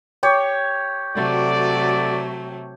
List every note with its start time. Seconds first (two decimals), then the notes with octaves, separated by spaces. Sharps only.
0.23 G4 C#5
1.15 C3 F#3 A3 F#4 A4 D5